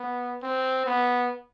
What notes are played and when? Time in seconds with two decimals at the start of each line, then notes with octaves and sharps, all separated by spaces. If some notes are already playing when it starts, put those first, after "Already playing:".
Already playing: B3
0.43 C4
0.86 B3